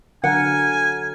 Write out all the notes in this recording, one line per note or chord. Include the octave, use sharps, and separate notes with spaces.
D3 F#3 A#4 F#5 G#5